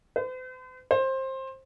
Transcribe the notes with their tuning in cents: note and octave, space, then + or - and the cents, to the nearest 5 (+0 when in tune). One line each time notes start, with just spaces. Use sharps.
C5 -45
C5 +20